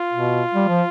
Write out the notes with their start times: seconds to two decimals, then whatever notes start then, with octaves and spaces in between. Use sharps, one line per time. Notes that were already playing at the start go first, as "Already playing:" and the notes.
Already playing: F4
0.13 B2
0.54 G3
0.68 F3